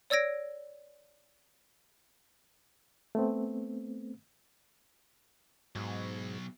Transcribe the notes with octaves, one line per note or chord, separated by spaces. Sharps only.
C#5 D5 E6 G#6 A#6 D7
A3 B3 C4
G#2 B2 F#3